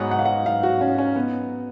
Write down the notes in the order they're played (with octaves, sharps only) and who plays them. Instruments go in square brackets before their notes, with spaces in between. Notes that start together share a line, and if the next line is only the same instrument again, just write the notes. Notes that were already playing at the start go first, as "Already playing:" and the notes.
Already playing: [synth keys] G#2 F#3 B3 D#4 [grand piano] F#5
[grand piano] F#5
F5
F#5
F5
F#4
C#4
C#4
B3